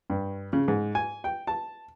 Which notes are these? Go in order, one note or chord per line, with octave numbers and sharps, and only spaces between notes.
G2
C#3
G#2
G#5
G5
A5